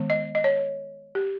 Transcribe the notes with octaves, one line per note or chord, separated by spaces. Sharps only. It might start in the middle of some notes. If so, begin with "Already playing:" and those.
Already playing: D#3 G#3 B3
D#5
D#5
C#5
G4